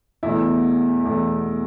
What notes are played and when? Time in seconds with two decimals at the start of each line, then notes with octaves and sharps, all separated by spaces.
0.23 E2 B2 A3 E4
1.04 E2 B2 A3